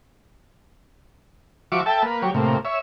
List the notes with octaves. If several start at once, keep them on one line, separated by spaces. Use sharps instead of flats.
F3 F#4 E5 C#6 D6
A4 E5 G5 A5
A#3 B4
F#3 G4 C#5
A2 C3 A#3
C#5 E5